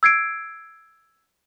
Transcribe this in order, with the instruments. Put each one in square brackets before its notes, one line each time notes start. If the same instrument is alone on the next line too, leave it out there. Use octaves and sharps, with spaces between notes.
[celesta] E6 G#6 C7 D7